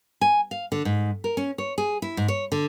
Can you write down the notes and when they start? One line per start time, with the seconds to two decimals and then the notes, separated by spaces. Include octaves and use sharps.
0.21 G#5
0.51 F5
0.72 D3
0.85 G#2
1.24 A#4
1.37 C#4
1.58 C#5
1.78 G#4
2.02 E4
2.17 G#2
2.28 C#5
2.52 D3